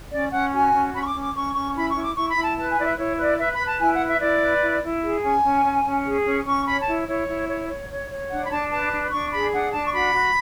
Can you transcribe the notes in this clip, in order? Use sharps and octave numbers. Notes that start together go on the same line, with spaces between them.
C#4 D5
C#4 F#5
F#4 G#5
C#4
C#4 B5
C#6
D6
C#4
D6
C#4 C#6
C#4 C#6
E4 B5
C#6
E4
D6
E4 C#6
B5
E4
A5
B4 A5
G#5
E4 D5
E5
E4 C#5
B4 D5
B4 E5
B5
B4
A5
E4 G#5
F#5
B4
E5
E4 D5
B4
E4
E4
G#4
C#4 G#5
C#4
C#4
C#4
G#4
C#4
C#4 C#6
C#5 B5
A5
E4
E4 C#5
E4
C#5
C#5
C#5
C#5
D4 F#5
B5
D4 A5
B4 A5
D4
D4 C#6
G#4 B5
D4 F#5
D4 A5
C#6
F#4 B5
F#4